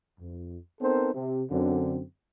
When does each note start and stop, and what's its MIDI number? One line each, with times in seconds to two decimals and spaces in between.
0.20 0.57 41
0.81 1.13 59
0.81 1.13 60
0.81 1.13 63
0.81 1.13 69
0.81 1.13 70
0.81 1.13 72
1.14 1.43 48
1.50 2.02 42
1.50 2.02 50
1.50 2.02 60